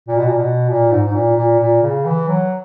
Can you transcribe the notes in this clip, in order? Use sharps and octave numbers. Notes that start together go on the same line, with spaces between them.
A#2
B2
A#2
B2
A#2
G#2
G#2
A#2
A#2
A#2
C#3
E3
F#3